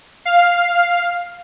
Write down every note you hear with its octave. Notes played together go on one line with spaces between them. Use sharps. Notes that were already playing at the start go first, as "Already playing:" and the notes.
F5